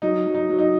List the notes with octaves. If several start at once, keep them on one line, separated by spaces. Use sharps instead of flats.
F#3 D#4
F#3
D#4
F#3
D#4